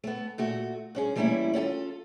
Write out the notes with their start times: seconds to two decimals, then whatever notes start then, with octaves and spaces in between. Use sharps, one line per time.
0.04 A3 B3
0.38 A#2 A3 F#4
0.95 G2 C#4 G#4
1.16 E3 G3 A3 A#3 C#4 E4
1.54 C#4 F4 F#4 A4